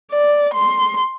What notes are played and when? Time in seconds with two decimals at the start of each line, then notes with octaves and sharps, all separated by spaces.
0.11 D5
0.54 C6